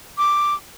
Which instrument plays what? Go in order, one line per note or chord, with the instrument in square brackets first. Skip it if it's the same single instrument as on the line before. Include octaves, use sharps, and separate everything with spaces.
[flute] D6